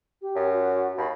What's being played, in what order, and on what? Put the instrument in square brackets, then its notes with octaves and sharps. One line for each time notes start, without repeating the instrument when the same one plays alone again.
[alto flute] G4
[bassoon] F#2
[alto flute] F#4
[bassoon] D#2 [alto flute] B5